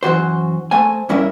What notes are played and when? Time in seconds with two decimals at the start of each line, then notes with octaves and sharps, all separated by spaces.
0.03 F#2 E3 F#4 C5
0.71 A3 C5 G#5
1.09 G2 C#4 E4 A#4 E5